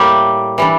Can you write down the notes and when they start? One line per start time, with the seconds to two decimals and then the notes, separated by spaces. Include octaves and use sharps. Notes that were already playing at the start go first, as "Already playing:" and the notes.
Already playing: A2 G3 A#3 G4
0.58 E3 G3 D4